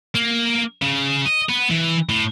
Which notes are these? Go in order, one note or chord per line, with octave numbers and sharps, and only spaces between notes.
A#3
C#3
D#5
B3
E3
A2